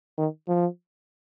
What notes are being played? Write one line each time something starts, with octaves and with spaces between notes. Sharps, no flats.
D#3
F3